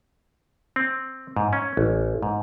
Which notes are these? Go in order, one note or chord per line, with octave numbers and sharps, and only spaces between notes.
C4
G#2
C#4
A1
G#2